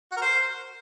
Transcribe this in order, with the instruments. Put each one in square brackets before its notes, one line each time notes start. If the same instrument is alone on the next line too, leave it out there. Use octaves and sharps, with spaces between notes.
[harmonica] F#4
A#4
C5